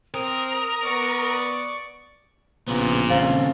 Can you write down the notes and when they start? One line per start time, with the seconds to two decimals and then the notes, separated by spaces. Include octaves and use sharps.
0.14 C4 A#4 D#6
0.83 B3 D5 C#6
2.68 A#1 A#2 C#3 B3
3.10 D#2 C#3 C4 A4 F5